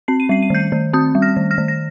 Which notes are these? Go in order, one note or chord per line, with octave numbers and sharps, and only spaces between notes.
C4 C7
D#7
G3 C7
D#7
D#3 G6 C7
D#3
C4 D#6 G6
G3
F6 A#6
D#3
F6 A#6
D#3
A#6